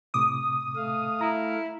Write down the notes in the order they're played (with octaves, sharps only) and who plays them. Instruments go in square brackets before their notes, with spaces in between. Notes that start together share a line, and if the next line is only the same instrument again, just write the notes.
[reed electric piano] A2 C3 D6 [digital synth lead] D#6
[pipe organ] A3 F5
[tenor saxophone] E4 [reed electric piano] A#5